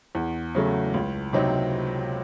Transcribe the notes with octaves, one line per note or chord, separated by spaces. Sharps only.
E2
C#3 F#3 A3
C#2
C3 F#3 C4 D#4